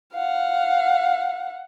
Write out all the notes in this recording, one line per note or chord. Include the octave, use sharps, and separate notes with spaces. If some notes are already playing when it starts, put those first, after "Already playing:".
F5 F#5